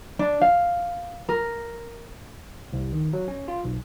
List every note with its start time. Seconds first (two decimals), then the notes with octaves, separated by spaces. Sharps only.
0.19 D4
0.41 F5
1.29 A#4
2.73 C2
2.93 D#3
3.13 F#3
3.28 C#4
3.48 F4
3.64 B1